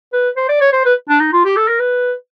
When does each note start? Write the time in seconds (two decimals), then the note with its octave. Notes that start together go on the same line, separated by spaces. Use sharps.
0.12 B4
0.36 C5
0.49 D5
0.61 C#5
0.72 C5
0.85 B4
1.09 D4
1.20 D#4
1.32 F4
1.45 G4
1.56 A4
1.68 A#4
1.79 B4